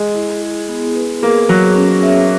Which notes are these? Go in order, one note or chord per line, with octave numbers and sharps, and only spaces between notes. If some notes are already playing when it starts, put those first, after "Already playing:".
Already playing: G#3
E4
G#4
B3
B4
A#3 G#4
F#3 C#5
C#4
E5